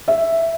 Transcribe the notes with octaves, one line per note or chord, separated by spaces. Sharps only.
E5